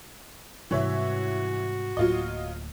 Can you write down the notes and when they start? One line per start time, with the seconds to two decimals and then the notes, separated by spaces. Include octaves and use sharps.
0.71 G#2 C3 E3 G3 F#4 C#5 E5
1.97 D1 A2 F#3 A#3 F4 D#5